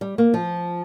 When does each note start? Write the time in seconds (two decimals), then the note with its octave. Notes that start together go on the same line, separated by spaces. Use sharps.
0.01 G3
0.18 A#3
0.34 F3